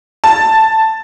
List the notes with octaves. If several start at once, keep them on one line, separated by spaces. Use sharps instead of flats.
A5